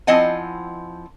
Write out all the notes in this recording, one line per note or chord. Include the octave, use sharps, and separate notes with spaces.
F3 C4 E4 D#5 F#5 G#5